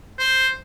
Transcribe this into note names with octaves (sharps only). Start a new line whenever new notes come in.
C5